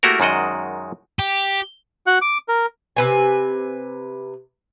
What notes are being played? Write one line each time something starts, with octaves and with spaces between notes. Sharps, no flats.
A3 A#3 E4 F#4 G4 A#4
F#2 D#3 G#3 F#4 D5 D#5
G4
F#4 F#5 F#6
D6
A#4
C3 B4 G#5